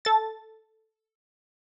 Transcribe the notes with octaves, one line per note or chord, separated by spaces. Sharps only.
A4 A6